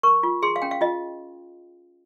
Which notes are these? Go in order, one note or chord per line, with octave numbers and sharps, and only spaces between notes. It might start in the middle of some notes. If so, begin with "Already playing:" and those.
A#4 C#6
F4
G#4 C6
F5
C#4 G5
F5
F4 D#5